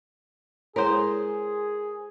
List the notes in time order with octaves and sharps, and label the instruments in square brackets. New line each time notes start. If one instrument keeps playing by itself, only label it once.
[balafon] G#3 E4 C#5 [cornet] G#4 [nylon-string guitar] A#4 C5